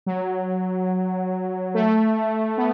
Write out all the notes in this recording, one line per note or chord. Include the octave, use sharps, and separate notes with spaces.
F#3
A3
B3